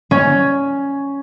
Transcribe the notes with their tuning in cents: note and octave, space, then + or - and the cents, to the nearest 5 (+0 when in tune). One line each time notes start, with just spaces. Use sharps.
C#4 +5